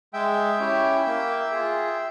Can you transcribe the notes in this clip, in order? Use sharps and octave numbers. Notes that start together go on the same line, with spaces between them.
G#3 E5 G5
C#4 E4 G4
A#3
F4 G#4